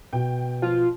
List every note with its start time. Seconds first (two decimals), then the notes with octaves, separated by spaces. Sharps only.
0.13 B2 G5
0.62 F3 F4